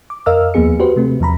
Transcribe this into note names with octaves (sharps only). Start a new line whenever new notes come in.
D6
F2 A#4 D#5 F5 E6 F6
D#2 F3 A#3 B3 G#4 C#7
F#4 G4 B4 C5
C3 A3 C4
E2 F3 A#5 B5